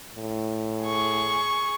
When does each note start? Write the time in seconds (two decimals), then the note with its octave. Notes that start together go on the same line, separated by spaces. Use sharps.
0.15 A2
0.83 G#4 C#6